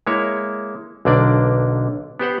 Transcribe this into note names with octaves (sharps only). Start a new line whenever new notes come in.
G#3 A#3 E4 C#5
B1 D3 A#3 D4 D5
B3 G4 C5 F#5